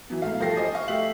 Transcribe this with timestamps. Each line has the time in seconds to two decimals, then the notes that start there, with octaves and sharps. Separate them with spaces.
0.10 E3 F#3 B3
0.22 G#2 A3 F5
0.40 G2 F3 G4 A4 A#6 C7
0.56 C5 D#5 G#5
0.75 F5 C#6
0.88 A3 G4 E5 C7 F#7